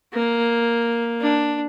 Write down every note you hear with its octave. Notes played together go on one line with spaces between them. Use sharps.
A#3
D4